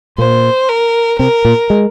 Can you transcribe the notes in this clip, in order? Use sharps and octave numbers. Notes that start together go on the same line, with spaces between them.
A#2 A#3 C5
A#4
C3 C4 A#4
A#2 A#3
G#3